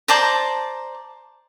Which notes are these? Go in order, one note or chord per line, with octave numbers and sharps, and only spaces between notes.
C5 D5 A5 A#5